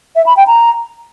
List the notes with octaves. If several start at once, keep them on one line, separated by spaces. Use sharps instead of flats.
E5
B5
G5
A#5